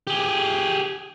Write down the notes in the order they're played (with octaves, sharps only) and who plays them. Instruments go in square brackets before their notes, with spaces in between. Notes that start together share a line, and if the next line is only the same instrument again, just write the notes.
[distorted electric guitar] G4 G#4